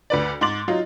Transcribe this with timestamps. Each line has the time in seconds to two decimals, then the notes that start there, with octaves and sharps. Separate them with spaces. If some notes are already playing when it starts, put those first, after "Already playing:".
0.10 D2 B4 D5
0.41 G#2 C6 D6 A6 F#7
0.68 F#3 D#4 F4